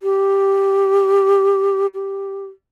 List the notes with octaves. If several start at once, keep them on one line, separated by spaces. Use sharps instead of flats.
G4
G4